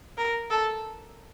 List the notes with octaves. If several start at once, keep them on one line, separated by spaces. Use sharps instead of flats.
A#4
A4